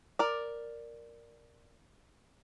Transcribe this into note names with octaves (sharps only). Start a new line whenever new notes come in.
A#4 D5